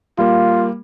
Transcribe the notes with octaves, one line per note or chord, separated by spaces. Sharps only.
G3 A#3 F4